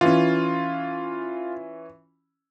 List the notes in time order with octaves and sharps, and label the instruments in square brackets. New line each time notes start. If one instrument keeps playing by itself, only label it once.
[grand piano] E3 C#4 [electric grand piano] F4